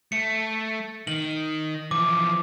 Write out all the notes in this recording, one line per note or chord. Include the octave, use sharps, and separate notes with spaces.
A3 C#7
D#3 F#7
E3 F3 D6